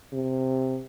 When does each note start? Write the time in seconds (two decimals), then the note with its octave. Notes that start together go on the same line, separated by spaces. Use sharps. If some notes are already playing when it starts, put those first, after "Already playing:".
0.13 C3